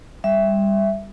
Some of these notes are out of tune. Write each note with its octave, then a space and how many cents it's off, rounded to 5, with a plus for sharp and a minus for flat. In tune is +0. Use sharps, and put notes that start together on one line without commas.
G3 +20 E5 +5